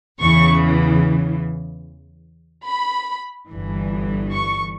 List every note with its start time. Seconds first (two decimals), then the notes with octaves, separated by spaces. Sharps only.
0.20 E2 C#3 E3 C#6
2.67 B5
3.49 G1 G2 E3
4.32 C#6